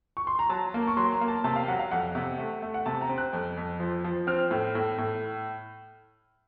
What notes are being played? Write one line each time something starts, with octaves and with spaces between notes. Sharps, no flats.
C#6
C6
A#5
F#3 A5
A#3
C#6
F#3 C6
A#5
A#3
A5
C3 A5
F5
F#3 F#5
F5
F2 F#5
C3
A3
A3
F#5
C3 A5
A#5
C4
F#6
F2
F2
F3
F3
C4 F6
A2
A2
A2